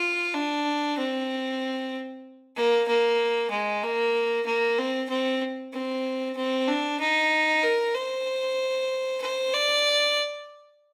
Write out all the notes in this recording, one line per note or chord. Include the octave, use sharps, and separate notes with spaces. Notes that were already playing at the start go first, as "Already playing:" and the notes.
Already playing: F4
D4
C4
A#3
A#3
G#3
A#3
A#3
C4
C4
C4
C4
D4
D#4
A#4
C5
C5
D5